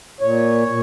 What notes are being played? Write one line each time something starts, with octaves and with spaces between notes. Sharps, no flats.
A#2 C#5
A#2